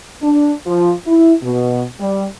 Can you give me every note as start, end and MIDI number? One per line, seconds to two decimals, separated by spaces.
0.22 0.52 62
0.66 0.92 53
1.06 1.33 64
1.43 1.84 47
1.99 2.24 55